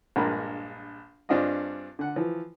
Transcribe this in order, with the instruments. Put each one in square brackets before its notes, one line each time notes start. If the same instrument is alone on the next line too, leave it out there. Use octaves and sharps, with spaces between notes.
[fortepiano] A#1 G2 G#3 A#3 B5
G2 C4 D4 F4 G#4 D#5
D3 F#5
E3 F3